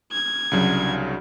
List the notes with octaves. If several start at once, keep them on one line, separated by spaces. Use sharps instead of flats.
G#6
C2 C#3 F#3 D4